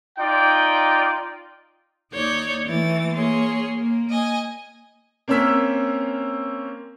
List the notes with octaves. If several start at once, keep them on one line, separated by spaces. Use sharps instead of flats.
D#4 F4 D5 G5
D#2 D#4 C#5 D5 G6
E3 A3 A6
A#3 G#4 C#5 C6
A#3
D#5 G#5
A#3 C4 C#4 A#4 E6 B6